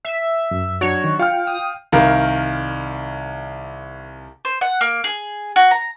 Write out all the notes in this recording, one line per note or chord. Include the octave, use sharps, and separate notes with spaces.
E5
F#2
F#3 D4 F#4 C#5
D#3
F4 F5 G5 F6 C#7
D#6
C2 D#3 A#4 F5
C5
F#5
A#3
G#4
F#4
A#5